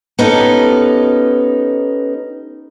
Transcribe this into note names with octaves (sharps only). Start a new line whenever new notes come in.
B3 C#4 D#4 G4 A4 B4